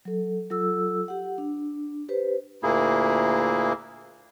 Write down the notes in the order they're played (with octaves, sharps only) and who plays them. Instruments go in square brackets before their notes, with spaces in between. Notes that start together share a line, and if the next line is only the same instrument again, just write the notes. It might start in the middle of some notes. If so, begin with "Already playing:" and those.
[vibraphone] F#3 A4
F#3 F4 A4 E6
G4 F#5
D4
G4 B4 C5
[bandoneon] D2 A#2 A#3 E4 G#4